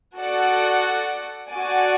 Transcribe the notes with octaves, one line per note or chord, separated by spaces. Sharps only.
F#4 A4 D5 F#5
F#4 A4 D5 G#5